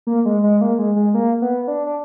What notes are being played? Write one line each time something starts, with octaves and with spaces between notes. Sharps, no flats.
A#3
G#3
G#3
A#3
G#3
G#3
A#3
B3
D4
D4